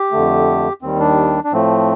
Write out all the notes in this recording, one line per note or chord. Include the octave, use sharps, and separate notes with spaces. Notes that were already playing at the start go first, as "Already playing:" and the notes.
Already playing: G4
F2 D3 A3
D#2 D#3 G3 C4
D4
D4
A2 F3 A3 C4